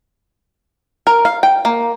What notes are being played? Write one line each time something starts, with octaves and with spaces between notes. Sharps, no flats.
A#4
F5
G5
A#3